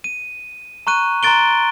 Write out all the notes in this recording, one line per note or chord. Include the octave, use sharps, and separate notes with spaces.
D#7
A#5 C#6 F#6 D#7
A#5 C6 F#6 A6 D7 G7